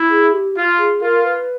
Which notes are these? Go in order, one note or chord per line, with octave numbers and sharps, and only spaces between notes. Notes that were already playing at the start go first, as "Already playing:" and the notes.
Already playing: E4
G#4
G4
F4
G#4
F4 A#4
B4